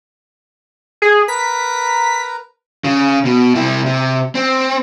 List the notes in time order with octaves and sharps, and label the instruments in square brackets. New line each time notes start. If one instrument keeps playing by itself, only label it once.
[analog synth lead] G#4
[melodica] A#4 B4 A#5 [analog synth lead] B6
[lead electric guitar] C#3
B2
C3 E4
C3
C4